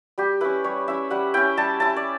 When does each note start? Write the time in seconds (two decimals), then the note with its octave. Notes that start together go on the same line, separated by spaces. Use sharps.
0.18 G3 G4
0.41 C#4 E4 B4
0.64 G3 C#5
0.88 C#4 E4 E5
1.10 G3 F#5
1.34 C#4 E4 G5
1.57 G3 A5
1.80 C#4 E4 A5
1.96 D5